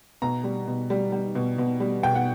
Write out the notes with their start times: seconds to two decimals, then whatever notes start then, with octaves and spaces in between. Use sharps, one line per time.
0.22 B2 A#5
0.44 G3
0.67 B2
0.90 G3
1.12 G3
1.35 B2
1.58 B2
1.80 G3
2.03 B2 G5
2.15 F#5